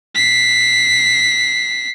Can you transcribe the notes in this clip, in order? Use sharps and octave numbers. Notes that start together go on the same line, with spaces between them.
B6 C7